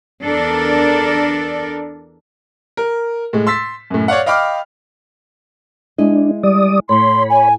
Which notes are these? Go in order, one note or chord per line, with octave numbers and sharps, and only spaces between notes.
E2 D4 A4 A#4 D5
A#4
A2 G#3
C6 E6 A6 B6
F#2 A2
C#5 D5 F5 F#5
D#5 F5 G5 B5 D6 F6
G#3 D4 E4 D#5
G3 D5 D#6
A2 C#5 B5 C6
G#5